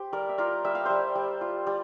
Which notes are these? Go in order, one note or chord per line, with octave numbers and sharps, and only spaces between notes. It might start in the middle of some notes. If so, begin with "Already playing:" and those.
Already playing: G4 C5
G3 A#4 D5
E5
F4 A#4 D5
G3 E5
F5
G3 C5 E5
G3
F4
G3